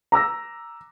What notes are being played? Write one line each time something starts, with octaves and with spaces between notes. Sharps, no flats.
A#5 D6 E6 A#6